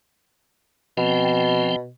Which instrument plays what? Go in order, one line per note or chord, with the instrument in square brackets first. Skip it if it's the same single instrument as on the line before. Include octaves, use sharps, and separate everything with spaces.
[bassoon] B2 [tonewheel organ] F3 C4 G5